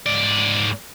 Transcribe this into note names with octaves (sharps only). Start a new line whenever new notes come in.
G#2 D5